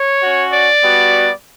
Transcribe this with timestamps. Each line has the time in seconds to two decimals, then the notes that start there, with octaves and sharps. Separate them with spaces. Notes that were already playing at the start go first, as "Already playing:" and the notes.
Already playing: C#5
0.22 C#4 F#4
0.53 D5
0.83 G3 B3 F#4